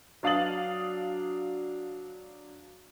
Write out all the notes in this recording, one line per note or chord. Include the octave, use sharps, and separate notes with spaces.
F#3 D4 F5 D#6 A6 F#7